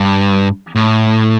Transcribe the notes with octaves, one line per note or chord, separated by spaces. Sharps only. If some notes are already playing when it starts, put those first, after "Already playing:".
Already playing: G2
A2